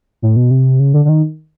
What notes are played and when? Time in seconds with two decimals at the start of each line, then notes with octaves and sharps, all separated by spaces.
0.22 A2
0.36 B2
0.51 C3
0.80 C#3
0.94 D3
1.05 D3
1.09 D#3